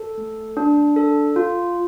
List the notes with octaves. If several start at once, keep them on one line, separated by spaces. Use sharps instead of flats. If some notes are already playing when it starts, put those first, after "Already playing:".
Already playing: A4
A3
D4
A4
F4